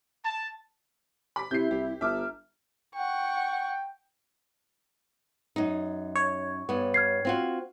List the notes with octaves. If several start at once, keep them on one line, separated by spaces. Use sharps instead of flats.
A5
B5 D6 B6
C3 E4 G6 C7
C2 G4
G1 E5 A5 A#5 D6 F6
F#5 G5 C#6
F#2 D#4
C#5
G2 B3
F6 G#6 C7
C4 F4 F#4